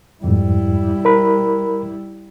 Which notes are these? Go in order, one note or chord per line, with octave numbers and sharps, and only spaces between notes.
F2 G#2 G3 E4
A#4 B5